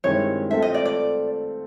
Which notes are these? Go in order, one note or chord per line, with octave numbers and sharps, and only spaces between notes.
G2 D#3 G#3 C4 E4 C#5
A3 C4 F4 A4 C5 E5
D#5
D5
D5